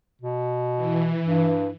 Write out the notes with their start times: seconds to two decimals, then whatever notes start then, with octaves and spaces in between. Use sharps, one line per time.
0.22 B2
0.76 E3
1.25 G2